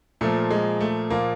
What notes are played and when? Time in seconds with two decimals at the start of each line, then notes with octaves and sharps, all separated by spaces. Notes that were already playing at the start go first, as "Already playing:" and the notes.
0.21 A#2 F3 A3
0.51 G#3
0.80 A3
1.10 A#2 F3 A#3